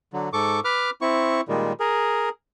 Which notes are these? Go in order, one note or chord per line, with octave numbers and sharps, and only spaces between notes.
D3 F#3
G#2 A4 C#6 D6
B4 D6 F6
C4 E4 C#6
A#2 D#3 G3 G#3
G#4 A#4